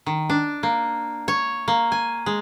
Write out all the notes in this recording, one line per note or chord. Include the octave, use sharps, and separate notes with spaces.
D#3
D4
A#3
C#5
A#3
G#5
G#3